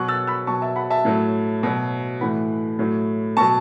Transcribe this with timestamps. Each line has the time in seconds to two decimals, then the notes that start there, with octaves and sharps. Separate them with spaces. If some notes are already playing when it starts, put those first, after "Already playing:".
Already playing: B2 F#3 C#6 F#6
0.08 E6 A6
0.27 B5 E6
0.47 B2 F#3 A5 C#6
0.62 E5 A5
0.76 F#5 B5
0.90 E5 A5
1.05 A2 F#3
1.63 B2 F#3
2.21 A2 E3 F#5 B5
2.79 A2 F#3
3.37 B2 F#3 A5 C#6